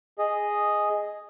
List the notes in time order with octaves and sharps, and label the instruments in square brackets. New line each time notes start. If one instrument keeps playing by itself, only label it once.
[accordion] G#4 D#5